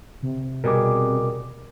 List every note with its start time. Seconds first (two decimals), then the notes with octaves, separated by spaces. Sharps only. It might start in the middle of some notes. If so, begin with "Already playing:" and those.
0.23 C3
0.64 B2 G3 G#4 A#4 D6